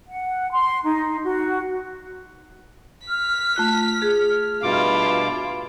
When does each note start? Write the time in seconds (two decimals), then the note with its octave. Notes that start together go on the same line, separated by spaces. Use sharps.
0.08 F#5
0.52 C6
0.84 D#4
1.24 F#4
3.07 F6 B6
3.56 A3 F4 F#6
4.02 G#4
4.63 G2 B2 E4 F4 D6